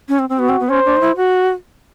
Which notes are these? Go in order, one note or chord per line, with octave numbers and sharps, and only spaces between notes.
C#4
C4
C4
B3 F#4
C4
B3
C#4 C5
D4
D#4
E4
F#4